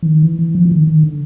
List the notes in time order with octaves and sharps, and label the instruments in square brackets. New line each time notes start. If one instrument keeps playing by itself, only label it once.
[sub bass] E3
D#3
E3
E3
F3
E3
D#3
D#3
D3